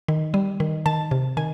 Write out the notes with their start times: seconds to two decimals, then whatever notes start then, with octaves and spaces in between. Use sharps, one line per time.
0.08 D#3
0.34 G3
0.60 D#3
0.86 D#3 A5
1.11 C3
1.37 D#3 G#5